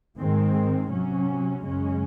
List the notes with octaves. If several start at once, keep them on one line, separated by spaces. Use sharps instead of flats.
G#2 D#3 G#3 C4
C3 F#3 C#4
F#2 C#3 G#3 C#4